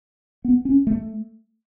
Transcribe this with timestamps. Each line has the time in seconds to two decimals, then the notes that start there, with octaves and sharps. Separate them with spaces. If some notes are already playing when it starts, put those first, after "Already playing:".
0.45 B3
0.65 C#4
0.87 A3